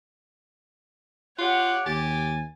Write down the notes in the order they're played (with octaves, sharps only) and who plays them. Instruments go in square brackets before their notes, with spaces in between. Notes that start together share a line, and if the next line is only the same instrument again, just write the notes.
[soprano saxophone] F4 [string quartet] G4 C#5 F#5 [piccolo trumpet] F#6
[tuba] D#2 [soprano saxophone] G4 [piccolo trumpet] G#5 [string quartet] A6